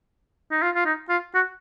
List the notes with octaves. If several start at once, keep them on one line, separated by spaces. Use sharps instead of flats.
D#4
F4
F4
D#4
F4
F#4